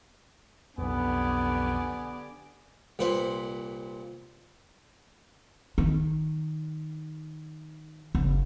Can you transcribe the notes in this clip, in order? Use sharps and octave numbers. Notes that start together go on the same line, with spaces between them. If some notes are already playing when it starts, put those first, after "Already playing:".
B1 F2 D3 B3 G4 D5 G#5
C2 A#2 B4 C5
D#3
F#1